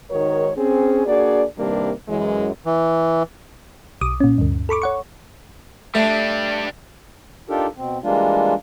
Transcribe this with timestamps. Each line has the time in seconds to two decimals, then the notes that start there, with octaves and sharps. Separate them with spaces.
0.11 G#2 D#3 F#4 A#4 C#5
0.56 C4 C#4 G#4
1.06 A#3 D4 F#4 G#4 D5
1.58 G2 C3 D#3 G3 A#3 D4
2.08 F#2 E3 G#3
2.66 E3
4.01 B1 D6 D#6
4.20 A#2 C#4
4.38 D2 G2
4.69 A4 B5 C#6 D6
4.82 C#5 F#5 C#6
5.95 G3 A3 D4
7.49 D4 D#4 F4 G4 A4 A#4
7.77 B2 C4
8.03 E3 G3 G#3 A#3 D4 F4